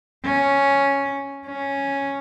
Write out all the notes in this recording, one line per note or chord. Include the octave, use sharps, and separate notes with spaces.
C#4
C#4